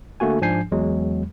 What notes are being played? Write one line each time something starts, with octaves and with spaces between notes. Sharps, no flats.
D3 A3 A#3 F#4 G#5
G#2 F3 D4 G#5 G6 C7
E2 F#3 G#3